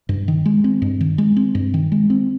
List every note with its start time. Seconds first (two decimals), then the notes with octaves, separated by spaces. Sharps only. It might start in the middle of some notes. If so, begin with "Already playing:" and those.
0.09 G2
0.28 D#3
0.46 G#3
0.64 C4
0.82 G2
1.01 D#3
1.18 G#3
1.37 C4
1.55 G2
1.74 D#3
1.92 G#3
2.10 C4